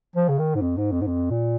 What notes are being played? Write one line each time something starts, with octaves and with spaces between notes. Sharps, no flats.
F3
C#3
D#3
G#2
F2
G#2
F2
G#2
F2
A#2